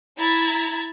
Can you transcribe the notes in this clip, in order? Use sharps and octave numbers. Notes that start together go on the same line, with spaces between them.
E4 A#5 B5 G#6 A6